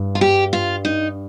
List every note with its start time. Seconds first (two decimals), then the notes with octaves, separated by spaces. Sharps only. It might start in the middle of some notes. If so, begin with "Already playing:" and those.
Already playing: G2
0.15 F4
0.21 G4
0.53 F4
0.85 D#4